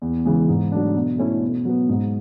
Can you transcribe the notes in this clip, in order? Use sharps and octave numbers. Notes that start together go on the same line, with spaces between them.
E2
C#3 E3 G#3
G#2
F#3 A3 D4
B2
A3 C#4 E4
B2
F#3 B3
G#2